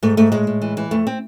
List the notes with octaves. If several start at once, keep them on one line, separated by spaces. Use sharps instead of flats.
G#2 A3
G#2 A3
A2 G#3
A2
E3
E3
F2 A3
C4